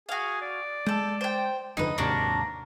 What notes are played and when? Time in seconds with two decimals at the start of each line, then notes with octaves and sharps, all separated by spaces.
0.09 F#4 G#4 F5
0.42 D5
0.86 G#3 A4 G6
1.21 C5 G5
1.77 F#1 F2 D3 D#4 B4
1.98 D#2 G#2 C3 A#3 D4 F#4 A#5